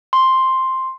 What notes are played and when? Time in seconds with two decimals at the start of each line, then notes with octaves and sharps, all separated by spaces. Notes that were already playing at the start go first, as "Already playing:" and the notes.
0.13 C6